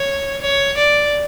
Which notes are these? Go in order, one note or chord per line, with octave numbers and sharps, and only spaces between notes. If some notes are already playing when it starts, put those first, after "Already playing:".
Already playing: C#5
C#5
D5